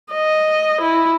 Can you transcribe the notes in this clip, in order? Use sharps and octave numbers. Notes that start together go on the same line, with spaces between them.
D#5
E4